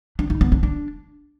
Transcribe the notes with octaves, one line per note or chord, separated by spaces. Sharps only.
D4
D#4
B3
D4
D4